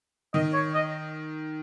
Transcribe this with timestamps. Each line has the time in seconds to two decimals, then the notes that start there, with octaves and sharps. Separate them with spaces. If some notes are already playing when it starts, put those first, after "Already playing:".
0.34 D#3 D#5
0.53 C#5
0.75 D#5